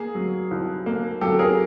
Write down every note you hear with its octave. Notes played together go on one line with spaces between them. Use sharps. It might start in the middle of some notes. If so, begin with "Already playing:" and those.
Already playing: A#3 G#4
F#3
C2
A#3
F#3 G4 A4
G#4 A#4